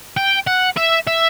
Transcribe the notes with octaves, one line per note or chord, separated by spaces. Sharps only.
G5
F#5
E5
E5